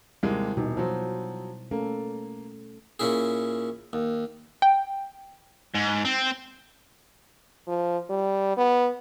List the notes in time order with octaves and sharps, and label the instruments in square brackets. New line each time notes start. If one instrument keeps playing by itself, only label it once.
[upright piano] D#2 C3 G#3 [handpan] G3 E4
[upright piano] D#1 [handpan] B2 D#4
[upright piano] F3 F#3 [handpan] C5
[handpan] A3 C#4 A4 [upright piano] A#3
[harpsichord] A#2 C#4 E4 G#4
D#2
[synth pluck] G5
[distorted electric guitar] G#2
C4
[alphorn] F3
G3
B3